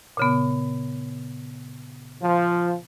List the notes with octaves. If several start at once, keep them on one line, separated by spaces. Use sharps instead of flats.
A#2 C#3 B3
F3